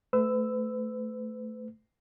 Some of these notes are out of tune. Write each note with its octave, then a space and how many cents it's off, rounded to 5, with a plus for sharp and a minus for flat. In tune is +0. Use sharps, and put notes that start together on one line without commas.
A3 +0 B4 +40 E6 +0